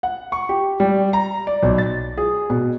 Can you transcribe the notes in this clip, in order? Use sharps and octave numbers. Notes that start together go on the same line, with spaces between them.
F#5
C#6
G4
G3
A#5
D5
B1
A6
G#4
B2